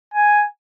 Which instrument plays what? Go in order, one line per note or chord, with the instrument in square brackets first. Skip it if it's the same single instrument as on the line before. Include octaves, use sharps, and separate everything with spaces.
[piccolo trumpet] G#5